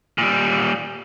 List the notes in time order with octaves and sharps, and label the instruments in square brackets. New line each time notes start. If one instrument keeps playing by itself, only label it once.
[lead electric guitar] A#2 G3